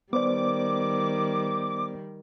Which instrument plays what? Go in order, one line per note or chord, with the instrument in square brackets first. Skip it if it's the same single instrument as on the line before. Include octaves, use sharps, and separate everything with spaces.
[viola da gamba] D#3 G3 [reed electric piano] B3 C5 D5 [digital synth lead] D6